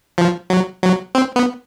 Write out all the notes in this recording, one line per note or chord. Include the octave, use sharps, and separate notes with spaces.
F3
F#3
F#3
C4
B3